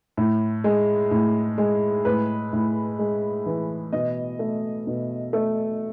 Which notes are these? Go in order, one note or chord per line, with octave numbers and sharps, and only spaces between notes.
A2
G#3
A2
G#3
A2 B4
A2
G#3
E3
B2 D#5
A3
B2
A3